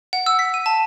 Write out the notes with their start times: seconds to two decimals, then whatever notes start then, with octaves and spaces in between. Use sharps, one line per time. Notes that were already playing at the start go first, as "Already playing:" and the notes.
0.13 F#5
0.26 E6
0.39 B6
0.54 D#7
0.66 A5